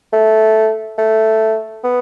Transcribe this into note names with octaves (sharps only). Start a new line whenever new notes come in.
A3
A3
B3